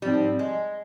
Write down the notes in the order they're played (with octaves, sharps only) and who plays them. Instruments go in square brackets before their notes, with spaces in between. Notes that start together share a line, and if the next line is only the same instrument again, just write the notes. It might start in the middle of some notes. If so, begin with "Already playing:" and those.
[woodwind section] G#2 F3 C4 [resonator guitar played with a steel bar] G3
[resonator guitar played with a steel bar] G#3